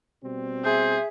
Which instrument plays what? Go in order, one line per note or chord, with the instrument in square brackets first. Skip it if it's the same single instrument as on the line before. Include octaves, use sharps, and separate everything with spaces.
[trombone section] B2 G3 C4
[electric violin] G#4 [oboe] C5 [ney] E5